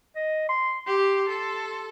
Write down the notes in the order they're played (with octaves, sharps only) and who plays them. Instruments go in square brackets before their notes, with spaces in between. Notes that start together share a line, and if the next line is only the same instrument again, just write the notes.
[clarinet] D#5
C6
[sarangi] G4 [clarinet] C6
[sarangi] A4